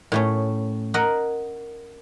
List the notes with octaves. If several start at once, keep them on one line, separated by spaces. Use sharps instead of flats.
A2 A3 C#4
A#4 D#5 F#5